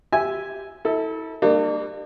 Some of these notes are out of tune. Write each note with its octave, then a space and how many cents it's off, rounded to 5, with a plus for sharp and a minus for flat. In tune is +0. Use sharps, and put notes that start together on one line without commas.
G4 +0 E5 +0 G#5 +0
E4 -35 A4 +10
G3 +20 A#3 -20 D4 +40